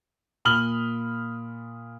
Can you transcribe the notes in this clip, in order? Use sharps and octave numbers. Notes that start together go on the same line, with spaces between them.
A#2 B5 D#6 F6 F#7 G7